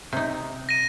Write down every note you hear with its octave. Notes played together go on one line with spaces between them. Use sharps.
C3 D#4
A#6 D#7